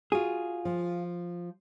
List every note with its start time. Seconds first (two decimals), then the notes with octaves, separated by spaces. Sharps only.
0.12 F4 F#4 G#4
0.65 F3